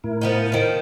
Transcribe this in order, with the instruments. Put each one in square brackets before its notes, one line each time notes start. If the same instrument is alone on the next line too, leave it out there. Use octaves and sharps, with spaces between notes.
[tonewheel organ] A2 E4 A#4
[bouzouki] F3 B3 D#4
D#3 F3